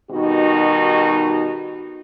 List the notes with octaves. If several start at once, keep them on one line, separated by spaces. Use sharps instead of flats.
B2 D#3 G3 D#4 F#4